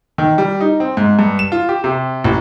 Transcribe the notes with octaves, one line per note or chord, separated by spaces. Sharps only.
D#3
G3
D#4
C4
G#2
G2
E7
F4
G4
C3
A1